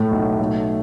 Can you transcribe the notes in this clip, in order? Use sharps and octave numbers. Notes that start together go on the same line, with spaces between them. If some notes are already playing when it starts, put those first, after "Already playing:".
Already playing: A2 A3
B1
A3